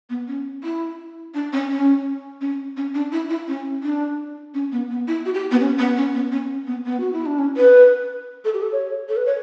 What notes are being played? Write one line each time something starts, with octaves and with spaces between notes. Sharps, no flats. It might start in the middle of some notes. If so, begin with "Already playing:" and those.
B3
C#4
E4
D4
C#4
C#4
C#4
C#4
D4
E4
E4
C#4
D4
C#4
B3
B3
E4
F#4
G4
B3
C#4
B3
C#4
B3
C#4
B3
B3
F#4
E4
D4
C#4
B4
A4
G4
A4
C#5
A4
B4
C#5